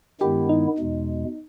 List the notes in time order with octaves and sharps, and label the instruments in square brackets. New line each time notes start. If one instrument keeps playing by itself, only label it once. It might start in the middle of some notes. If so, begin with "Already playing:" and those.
[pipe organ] G2 D#3 G#3 B3 E4 [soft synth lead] G4
[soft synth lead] D#4
[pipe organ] E2 B2 G#3